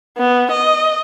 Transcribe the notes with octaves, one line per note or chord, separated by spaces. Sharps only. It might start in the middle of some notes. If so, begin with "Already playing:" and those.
B3
D#5